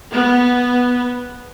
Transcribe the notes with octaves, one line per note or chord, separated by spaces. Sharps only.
B3